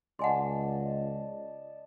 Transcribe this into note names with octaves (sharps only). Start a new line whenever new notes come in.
C#2 D5 D#5 F#5 G#5 A5 C6